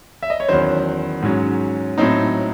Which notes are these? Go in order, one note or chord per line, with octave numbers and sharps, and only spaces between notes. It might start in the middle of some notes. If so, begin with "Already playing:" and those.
E5
D#5
C#5
E2 D#3 F#3 C#4 C5
G#2 F#3 C#4
A2 F#3 C4 D#4